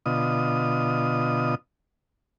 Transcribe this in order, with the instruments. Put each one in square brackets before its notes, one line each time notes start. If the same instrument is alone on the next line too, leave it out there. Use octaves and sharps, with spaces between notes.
[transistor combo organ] B2 D3 F4 D#5 D#6